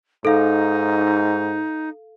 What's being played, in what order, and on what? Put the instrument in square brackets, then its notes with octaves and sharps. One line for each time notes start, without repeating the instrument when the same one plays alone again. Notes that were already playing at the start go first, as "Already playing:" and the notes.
[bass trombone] G#2 [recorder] D#4 [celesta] A4 F5